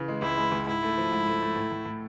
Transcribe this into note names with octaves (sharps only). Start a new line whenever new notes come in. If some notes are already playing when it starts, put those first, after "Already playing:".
Already playing: C#3 E3
G#3
C#2 E4
G#3
C#2
G#2 E4
A3
F3
G#2
A3
A3
A2
A2
A2